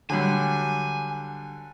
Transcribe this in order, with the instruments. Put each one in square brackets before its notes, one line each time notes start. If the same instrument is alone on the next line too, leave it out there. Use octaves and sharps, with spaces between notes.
[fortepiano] D3 F#3 G3 [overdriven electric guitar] G#5